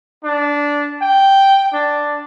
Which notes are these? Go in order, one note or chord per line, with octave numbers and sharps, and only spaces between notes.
D4
G5
D4